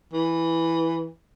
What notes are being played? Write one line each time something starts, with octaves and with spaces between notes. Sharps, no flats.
E3